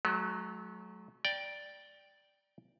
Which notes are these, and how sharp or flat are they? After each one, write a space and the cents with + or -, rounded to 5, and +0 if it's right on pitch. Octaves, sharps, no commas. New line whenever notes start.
F#3 +0 A3 -45
D5 +0 G5 +0 A#5 +35